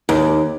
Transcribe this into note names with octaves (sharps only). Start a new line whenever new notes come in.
D#2